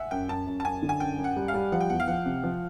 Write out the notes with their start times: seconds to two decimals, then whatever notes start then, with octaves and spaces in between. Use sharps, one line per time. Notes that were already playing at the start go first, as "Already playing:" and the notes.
Already playing: E5 F#5 G#5
0.11 F#2 G5
0.29 F#2 A5
0.47 F#2
0.60 A5
0.65 F#2 G#5
0.82 D3
0.89 G#5
1.00 F#2 G5
1.18 F#2
1.24 F#5
1.36 G3
1.48 F5
1.54 G3
1.72 F3 F#5
1.81 G5
1.90 E2 F#5
2.00 F5
2.08 F3 F#5
2.26 C3
2.43 F3